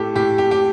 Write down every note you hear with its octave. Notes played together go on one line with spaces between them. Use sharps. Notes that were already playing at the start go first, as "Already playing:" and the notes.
Already playing: A2 G4 A4
A2 G4
G4
G4